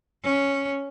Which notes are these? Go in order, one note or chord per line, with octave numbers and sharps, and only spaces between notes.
C#4